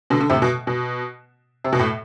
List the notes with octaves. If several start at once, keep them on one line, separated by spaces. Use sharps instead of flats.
B2 D3
D3
A2 C3
B2
B2
C3
B2
A2